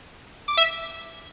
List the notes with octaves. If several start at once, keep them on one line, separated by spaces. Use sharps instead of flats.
D6
E5